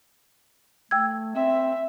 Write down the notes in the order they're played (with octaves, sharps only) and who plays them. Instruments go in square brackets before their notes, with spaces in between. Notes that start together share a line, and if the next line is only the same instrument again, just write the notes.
[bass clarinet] A3 [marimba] G5 E6 G#6
[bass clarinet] C4 [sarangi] E5